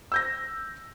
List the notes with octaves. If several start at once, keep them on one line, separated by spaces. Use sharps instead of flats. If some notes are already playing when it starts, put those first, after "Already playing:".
E6 G6 A#6